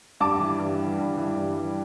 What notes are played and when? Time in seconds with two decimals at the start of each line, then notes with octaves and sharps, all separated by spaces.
0.20 G2 A5 D6
0.40 E3
0.59 G2
0.78 G3
0.98 G2
1.17 E3
1.36 G2
1.55 G3